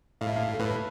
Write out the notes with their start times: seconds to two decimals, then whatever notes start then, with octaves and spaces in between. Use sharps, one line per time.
0.21 A2 F5
0.29 E5
0.36 F5
0.53 A4
0.60 A2 B4